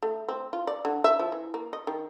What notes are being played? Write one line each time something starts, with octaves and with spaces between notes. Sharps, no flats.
A3
C4
F4
D5
D3
E5
F3
E3
A#3
D#5
D#3